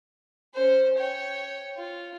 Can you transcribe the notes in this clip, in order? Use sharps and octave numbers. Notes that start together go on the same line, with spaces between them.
C#4 C5
C#5 G5
F4